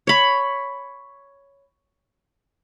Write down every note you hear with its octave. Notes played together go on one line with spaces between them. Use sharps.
C#5 B5